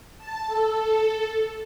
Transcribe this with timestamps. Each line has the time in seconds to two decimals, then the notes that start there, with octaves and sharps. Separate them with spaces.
0.18 A5
0.47 A4